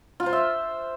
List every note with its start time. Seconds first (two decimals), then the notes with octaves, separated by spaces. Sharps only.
0.20 F4
0.26 C5
0.33 E5